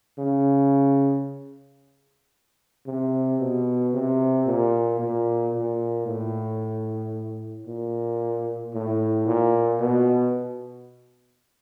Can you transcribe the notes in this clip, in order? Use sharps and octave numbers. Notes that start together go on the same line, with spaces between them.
C#3
C3
B2
C3
A#2
A#2
A#2
A2
A#2
A2
A#2
B2